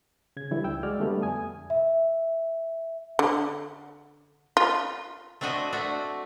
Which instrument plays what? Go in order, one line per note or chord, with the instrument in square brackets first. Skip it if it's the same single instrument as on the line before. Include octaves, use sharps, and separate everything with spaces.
[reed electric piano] C#3 G#6
D3 E3 F#3 G3 E4
C#2 G5 E6
G#3 F#4 D5 F6
D3 G3 A3 B3
F2 G#5 D#6
[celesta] E5
[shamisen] D3
F4
[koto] A3 C4 D4 F#4 D#5
A3 D4 F#4